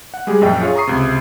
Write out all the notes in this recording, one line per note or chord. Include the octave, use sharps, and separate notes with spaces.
F#5
G3 G#3 G4 G#4
A#1 F#2 D#5 G5
F4 G#4 C#5
A#5 C#6 D#6 C7
C#2 C3